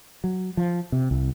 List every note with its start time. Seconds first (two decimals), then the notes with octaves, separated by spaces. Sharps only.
0.24 F#3
0.57 F3
0.92 C3
1.11 C2